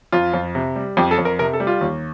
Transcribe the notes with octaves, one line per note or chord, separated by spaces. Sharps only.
F2 F4
F2
C3
G3
F2 G4
A4
F2
A#4
C3 A#4
A4
G3
F4
D#2